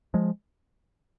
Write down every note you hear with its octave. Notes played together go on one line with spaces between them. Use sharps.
F3 G#3